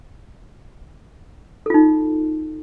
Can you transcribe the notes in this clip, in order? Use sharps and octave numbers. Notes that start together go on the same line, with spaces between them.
D#4 F4 A4